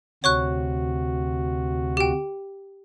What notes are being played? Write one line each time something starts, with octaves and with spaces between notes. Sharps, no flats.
D2 C3 F#4 C#5 C#6 F#6
G4 G5